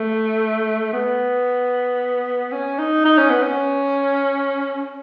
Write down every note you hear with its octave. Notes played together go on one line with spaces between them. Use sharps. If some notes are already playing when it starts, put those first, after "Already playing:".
Already playing: A3
B3
C#4
D#4
D#4
C#4
B3
C#4